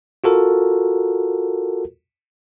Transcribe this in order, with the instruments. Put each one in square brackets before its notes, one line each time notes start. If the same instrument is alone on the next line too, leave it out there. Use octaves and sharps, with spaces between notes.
[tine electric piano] F4 F#4 A4 A#4